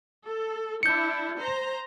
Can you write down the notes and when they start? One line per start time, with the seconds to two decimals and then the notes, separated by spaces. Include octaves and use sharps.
0.25 A4
0.83 D4 E4 G6 C#7
1.38 C5 A#5